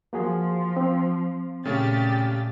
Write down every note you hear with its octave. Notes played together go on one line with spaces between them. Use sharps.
F3 A#3 F#4 G#4
C4
A#2 C#3 A3 C#4 G4 A6